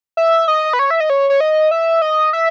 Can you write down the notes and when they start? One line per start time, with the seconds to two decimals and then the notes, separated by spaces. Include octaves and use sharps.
0.17 E5
0.48 D#5
0.73 B4
0.79 C#5
0.90 E5
1.00 D#5
1.10 C#5
1.30 C#5
1.40 D#5
1.71 E5
2.02 D#5
2.33 E5